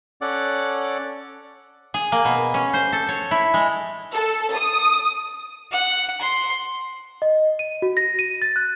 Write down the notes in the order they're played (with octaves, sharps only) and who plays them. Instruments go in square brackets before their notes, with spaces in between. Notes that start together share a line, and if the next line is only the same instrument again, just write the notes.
[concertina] C#4 A4 D5 F#5 D6
[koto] G#4
A#3
B2
C#4
C5
A4
C#5
E4
G#3
[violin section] A4
D#6
[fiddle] F#5
C6
[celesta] D#5
D#7
F#4
A#6
D#7
A6
F#6